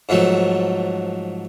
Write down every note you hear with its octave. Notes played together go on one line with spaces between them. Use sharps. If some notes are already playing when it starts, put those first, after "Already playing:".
G#2 F3 F#3 A3